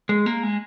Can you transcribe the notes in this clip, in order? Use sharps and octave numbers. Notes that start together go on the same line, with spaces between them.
G#3
A#3
G#3